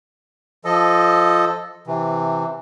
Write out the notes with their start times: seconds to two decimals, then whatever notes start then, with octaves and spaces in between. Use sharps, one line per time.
0.65 F3 A4 D#5
1.87 C3 E3